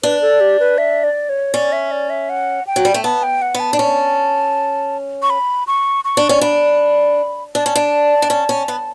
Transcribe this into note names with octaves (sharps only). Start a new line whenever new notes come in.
D4 B4
A4
G4
B4
E5
D5
C#5
C#4 D5
E5
D5
E5
F#5
G5
F#3
G3
A3
B3 A5
G5
F#5
B3
A5
D4
C#4
C#6
B5
C#6
C#6
D4
C#4
D4 B5
D4 A5
C#4
D4
D4
C#4
C#4
B3